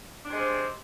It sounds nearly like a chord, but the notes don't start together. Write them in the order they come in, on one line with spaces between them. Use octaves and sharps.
D4 C3 G#3 G3 C4